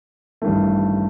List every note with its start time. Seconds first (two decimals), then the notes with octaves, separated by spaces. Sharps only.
0.42 A1 G2 D#3 A3